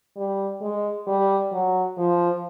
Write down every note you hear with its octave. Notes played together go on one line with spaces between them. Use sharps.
G3
G#3
G3
F#3
F3